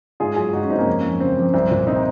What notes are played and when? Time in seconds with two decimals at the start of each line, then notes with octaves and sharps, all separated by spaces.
0.20 G#2 F4 G#4
0.36 F#3 F4 G#4
0.53 G#2 D#4 F#4
0.63 C#4
0.70 G#2 C4 D#4
0.79 A#3 C#4
0.87 F2
1.04 F2
1.20 C#3 C4
1.37 F2
1.53 C2 C4
1.71 A#2
1.87 C4 D#4